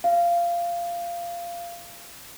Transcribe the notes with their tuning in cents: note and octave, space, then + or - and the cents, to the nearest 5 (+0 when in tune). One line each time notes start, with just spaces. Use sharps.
F5 -15